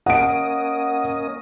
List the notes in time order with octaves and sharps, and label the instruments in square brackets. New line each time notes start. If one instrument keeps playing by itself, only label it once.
[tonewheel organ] A#3 C#4 D#5 [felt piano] F#5 D7